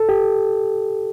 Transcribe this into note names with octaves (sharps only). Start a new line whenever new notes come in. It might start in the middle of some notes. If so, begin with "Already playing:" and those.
Already playing: A4
G4